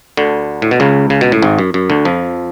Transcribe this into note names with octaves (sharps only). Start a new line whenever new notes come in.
D2 D3
A2
B2
C#2 C#3
C#3
B2
A2
G#1 G#2
F#2
F#2
D2 D3
F2 F3